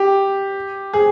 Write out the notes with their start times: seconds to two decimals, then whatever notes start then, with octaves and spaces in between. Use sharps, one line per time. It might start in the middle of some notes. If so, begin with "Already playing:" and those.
Already playing: G4
0.93 G#4